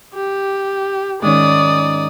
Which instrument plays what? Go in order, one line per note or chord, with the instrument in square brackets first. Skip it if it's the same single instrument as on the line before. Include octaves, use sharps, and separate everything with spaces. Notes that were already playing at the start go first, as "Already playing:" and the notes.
[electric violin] G4
[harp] G#2 D#3 C#4 [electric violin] D5 D#6